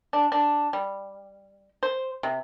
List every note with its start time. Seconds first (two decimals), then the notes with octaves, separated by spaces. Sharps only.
0.13 D4
0.32 D4
0.73 G3
1.83 C5
2.23 C3